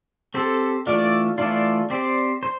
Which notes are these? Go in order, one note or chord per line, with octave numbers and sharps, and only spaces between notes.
C4 G4 A4 C5
E3 A3 D4 F4 D5
E3 A3 D4 F4 D5
C4 G4 C5 D5
C5